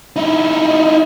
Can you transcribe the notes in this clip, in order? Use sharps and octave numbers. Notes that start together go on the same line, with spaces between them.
D#4 E4